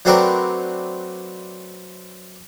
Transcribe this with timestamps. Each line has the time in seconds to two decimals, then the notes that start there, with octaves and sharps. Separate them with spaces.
0.05 F#3 A3 C4 D4 A#4 B4